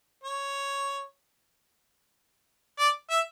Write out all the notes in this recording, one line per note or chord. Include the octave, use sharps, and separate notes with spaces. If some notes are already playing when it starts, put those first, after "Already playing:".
C#5
D5
E5